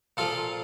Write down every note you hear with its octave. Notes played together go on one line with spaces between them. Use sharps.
A#2 F3 F4 A4